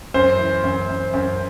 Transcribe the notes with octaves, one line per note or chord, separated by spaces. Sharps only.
F#2 C5
E3
F#2
F#2
F#2